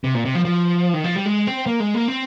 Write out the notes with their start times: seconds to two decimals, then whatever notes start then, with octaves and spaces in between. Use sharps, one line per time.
0.04 C3
0.15 A#2
0.25 C3
0.35 F3
0.45 F3
0.94 D#3
1.04 F3
1.16 G3
1.26 G#3
1.47 C4
1.66 A#3
1.80 G#3
1.94 A#3
2.08 C4